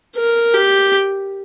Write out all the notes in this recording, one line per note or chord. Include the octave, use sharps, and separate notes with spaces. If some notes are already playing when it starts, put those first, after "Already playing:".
A#4
G4